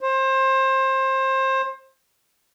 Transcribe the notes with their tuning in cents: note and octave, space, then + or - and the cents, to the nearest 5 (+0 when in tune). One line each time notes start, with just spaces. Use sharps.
C5 +25